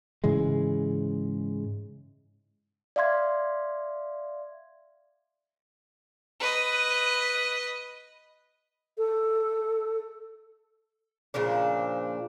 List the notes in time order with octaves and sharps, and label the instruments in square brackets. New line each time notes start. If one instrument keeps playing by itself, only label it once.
[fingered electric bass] G#2 C#3 E3 G#3
[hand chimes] D5 E5 F5 C6 G#6
[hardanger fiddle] B4 D#5
[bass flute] A4
[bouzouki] A#2 C#3 F3 D4